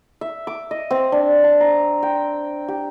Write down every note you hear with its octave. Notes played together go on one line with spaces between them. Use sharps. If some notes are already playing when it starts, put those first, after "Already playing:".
E5
D6
D#5
C4
D4
A5
A#5
G5
G4